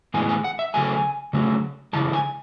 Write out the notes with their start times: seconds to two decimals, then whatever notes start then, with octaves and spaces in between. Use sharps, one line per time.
0.14 A2 E3 G#3 B3 G#5
0.29 G#5
0.44 F#5
0.59 E5
0.74 C#3 F#3 A3 G#5
1.33 C#3 F#3 A3
1.93 C#3 E3 G#3 A5
2.13 G#5